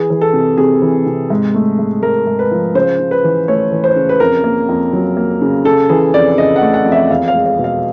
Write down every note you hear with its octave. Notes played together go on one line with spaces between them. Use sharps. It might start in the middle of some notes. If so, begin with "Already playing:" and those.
Already playing: E3 G#4
E3
A4
C3
C3 G#4
E3
C3
G#2
A3
G#2
G#2 A#4
G#2
B4
F3
C#3 C5
C#3
B4
E3
A3 C#5
E3
C5
C#3
B4
F2 A#4
A#3
F2
F#3
A#3
C#3
C#3 A4
E3 G#4
F2 D5
C#3 D#5
F#5
A3
F#5
F2
E5
E2 F5
F5
G#3
F5
B2
F5